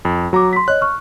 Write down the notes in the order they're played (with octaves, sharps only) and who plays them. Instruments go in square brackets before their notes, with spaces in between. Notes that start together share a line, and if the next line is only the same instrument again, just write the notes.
[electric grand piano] F2
[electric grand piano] F#3 A#5 [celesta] F#4 D6
[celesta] C6 B6
[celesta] C#5 D#5 [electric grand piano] F#6
[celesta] C#6 F6